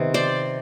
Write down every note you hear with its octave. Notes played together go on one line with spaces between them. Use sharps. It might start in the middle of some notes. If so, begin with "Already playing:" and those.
Already playing: C3 D#3 B3
C5 D5